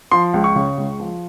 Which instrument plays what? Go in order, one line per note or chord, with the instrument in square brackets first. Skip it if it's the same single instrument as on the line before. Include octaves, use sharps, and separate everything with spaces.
[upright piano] F3 C6
C#2
C#6
C#3
C#2
F3